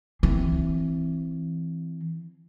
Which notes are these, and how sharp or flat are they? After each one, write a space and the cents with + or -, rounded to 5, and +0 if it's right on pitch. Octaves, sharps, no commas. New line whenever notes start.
E3 +0 C4 +0